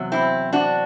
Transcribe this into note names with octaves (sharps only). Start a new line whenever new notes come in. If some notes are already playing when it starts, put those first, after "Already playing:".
Already playing: E2 C3 F#3
C4 E4
D4 F#4